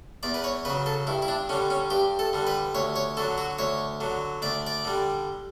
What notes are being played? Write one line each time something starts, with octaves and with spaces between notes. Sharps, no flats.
E2 D5
B4
C#5
C#3 F#3 B4
A4
G2 E4
E4
D4
D3 G3 C#4
C#4
G2 G4
A4
D3 G3
B4
D2 C#5
C#5
D3 F#3 A4
F#4
D2 C#5
D3 F#3
D2 D5
D5
D3 G3